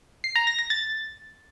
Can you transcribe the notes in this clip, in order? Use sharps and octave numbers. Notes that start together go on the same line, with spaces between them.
C7
A#5
A#6
A#6
A6